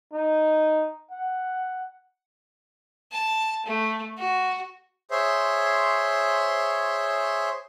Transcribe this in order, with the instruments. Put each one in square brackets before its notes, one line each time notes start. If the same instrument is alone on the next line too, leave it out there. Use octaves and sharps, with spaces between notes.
[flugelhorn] D#4
F#5
[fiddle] A5
A3
F#4
[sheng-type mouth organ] G#4 C5 C#5 E5 C6